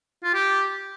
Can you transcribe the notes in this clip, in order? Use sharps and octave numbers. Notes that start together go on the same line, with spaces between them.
F4
G4